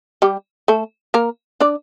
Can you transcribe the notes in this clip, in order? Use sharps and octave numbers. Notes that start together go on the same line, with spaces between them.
G3 G4
A3 A4
A#3 A#4
D4 D5